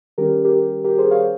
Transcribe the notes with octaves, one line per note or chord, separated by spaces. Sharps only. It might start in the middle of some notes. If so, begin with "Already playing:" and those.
D#3 G3 C#4 G4 A#4
G4 A#4
G4 A#4
G#4 C5
C#5 F5